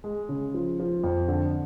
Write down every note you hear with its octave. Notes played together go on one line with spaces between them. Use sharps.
G#3
C#3
F3
F3
F2
D3